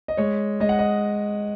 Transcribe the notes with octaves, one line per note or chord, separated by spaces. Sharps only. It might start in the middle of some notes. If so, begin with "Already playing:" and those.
D#5
G#3 C#5
G#3 D#5
F#5
D#5